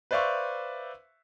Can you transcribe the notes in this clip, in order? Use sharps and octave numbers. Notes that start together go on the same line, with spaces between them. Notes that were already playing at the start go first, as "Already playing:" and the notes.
B4 C5 D5 E5 F5 C#6